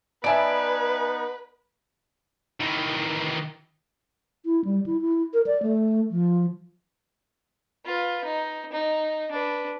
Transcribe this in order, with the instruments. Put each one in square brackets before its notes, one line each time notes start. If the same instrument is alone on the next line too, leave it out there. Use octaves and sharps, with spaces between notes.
[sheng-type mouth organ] B3 D#4 [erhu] B4 [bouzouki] D5 A5 [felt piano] E5 G#5 D7
[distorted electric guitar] D#3 E3
[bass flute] E4
G3
E4
E4
A#4
D5
A3
F3
[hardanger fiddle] F4 B4
D#4
D#4
D4 B4